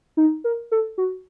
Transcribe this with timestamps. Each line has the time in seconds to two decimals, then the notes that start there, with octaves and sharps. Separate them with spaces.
0.17 D#4
0.44 A#4
0.72 A4
0.98 F#4